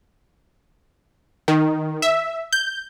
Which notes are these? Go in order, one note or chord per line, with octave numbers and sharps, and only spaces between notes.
D#3
E5
G6